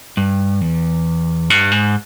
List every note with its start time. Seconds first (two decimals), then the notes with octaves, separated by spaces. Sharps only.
0.17 G2
0.61 E2
1.50 G2
1.72 G#2